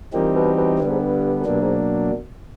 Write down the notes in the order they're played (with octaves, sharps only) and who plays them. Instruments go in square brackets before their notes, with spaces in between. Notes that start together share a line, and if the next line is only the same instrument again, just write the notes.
[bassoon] A#2 [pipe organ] E3 G3 C4 D#4 G4
[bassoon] B2
B2
[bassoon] G2 [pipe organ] D3 G3 B3
[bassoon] G#2
G2
F#2
[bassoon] G2 [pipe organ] B2 F#3 A#3 D4
[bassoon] G#2